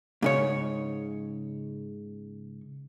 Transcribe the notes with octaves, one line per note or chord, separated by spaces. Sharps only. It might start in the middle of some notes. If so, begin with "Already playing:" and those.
G#2 C#3 C#5